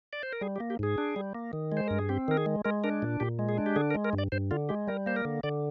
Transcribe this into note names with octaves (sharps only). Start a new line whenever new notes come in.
D5
C5
A#4
G3 G#4
G4
A#3
G4
G#2 G#4
D4
G3
A#3
D#3
G#3
C5
G2 A#4
G#4
C4 G4
D#3 A#4
G#4
G#3
G#3 A#4
D4 A#4
A#2
A#2 G4
G#3
G#4
D4
G4
D3 G#4
A#4
G#3
A#4
G2
D5
G2 C5
D3 F4
G#3 G4
G3 A#4
A#3 C5
A#4
D3
D3 D5